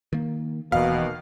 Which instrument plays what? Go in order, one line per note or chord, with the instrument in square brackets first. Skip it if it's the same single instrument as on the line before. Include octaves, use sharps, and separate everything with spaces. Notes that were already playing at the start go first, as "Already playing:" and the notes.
[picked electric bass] D#3 A#3
[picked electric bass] D#1 E3 [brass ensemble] B2 D#3 A#3 [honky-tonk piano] F5